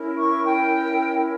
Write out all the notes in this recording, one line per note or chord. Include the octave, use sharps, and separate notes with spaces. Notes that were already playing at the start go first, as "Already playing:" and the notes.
Already playing: C#4 E4 A#4
C#6
G5